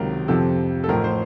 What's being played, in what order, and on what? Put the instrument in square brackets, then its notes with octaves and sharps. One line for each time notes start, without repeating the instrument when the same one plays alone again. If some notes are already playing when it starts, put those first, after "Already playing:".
Already playing: [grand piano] C#2 C3 D#3 F#3 A#4
F2 C3 F3 A4
A4
A1 A2 F3 A#4
C5